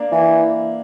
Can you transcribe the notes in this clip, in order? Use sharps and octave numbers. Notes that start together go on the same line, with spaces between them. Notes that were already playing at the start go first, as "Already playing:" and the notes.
Already playing: A#3 D4
E3